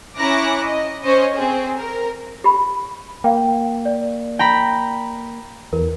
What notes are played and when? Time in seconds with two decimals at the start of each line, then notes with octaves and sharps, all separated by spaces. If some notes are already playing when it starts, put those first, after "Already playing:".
0.17 C#4 E4 A#5 D6 F#6 A#6
0.64 D#5
1.02 C#4 C5 C#5 D#5
1.34 C4 G#4
1.75 A#4
2.44 G4 B5
3.24 A#3 F5 G5
3.85 D5
4.39 G5 A#5 B5
5.73 E2 A#4